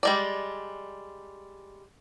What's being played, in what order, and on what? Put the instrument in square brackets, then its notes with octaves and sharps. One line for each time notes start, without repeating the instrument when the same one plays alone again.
[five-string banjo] G3 G#3 D5